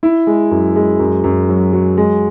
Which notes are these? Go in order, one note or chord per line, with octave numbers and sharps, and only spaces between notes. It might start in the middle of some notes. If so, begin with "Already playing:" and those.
E4
G#3
F#2
G#3
F#2
F#2
F#3
F#3
G#3